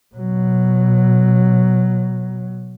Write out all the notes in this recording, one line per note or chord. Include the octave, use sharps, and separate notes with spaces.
B2 F#3